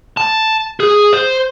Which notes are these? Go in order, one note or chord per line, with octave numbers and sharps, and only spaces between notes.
A5
G#4
C5